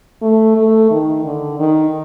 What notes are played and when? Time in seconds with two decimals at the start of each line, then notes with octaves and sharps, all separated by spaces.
0.22 A3
0.57 A3
0.91 D#3
1.25 D3
1.60 D#3